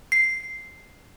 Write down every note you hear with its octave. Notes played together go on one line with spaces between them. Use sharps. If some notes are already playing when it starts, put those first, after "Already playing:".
C7